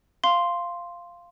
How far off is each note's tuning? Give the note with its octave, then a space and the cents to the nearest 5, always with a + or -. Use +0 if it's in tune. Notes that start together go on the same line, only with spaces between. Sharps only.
F5 -5 C6 +0